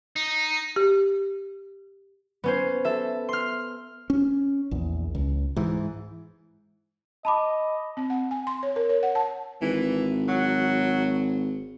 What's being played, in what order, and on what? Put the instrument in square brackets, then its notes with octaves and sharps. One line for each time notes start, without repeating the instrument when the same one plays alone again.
[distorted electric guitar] D#4
[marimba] G4
[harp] B3 C#4 C5
A4 E5
C6 F6
[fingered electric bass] C#4
A#1 E2
C#2
G#2 E3
[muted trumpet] D#5 [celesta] A5 B5 D6
[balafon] C4
F#5
G#5
C6
C#5
A#4
C#5
F#5
A5
[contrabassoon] G#1 [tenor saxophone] E3
[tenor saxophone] F#3